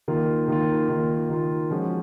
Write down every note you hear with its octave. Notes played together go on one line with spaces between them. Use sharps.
D#3 A#3 F4
D#3 A#3 F4
D#3 A#3 F4
D#3 A#3 F4
F3 G#3 C#4 F#4